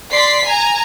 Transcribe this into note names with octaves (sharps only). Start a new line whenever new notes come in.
D5 C6 B6 C7
G#5 A#5